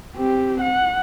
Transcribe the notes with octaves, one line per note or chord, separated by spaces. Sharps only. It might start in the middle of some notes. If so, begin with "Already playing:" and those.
C4 G4
F#5